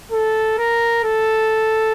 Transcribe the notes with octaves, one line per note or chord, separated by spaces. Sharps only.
A4
A#4
A4